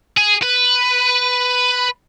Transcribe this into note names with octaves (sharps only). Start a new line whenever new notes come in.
G#4
B4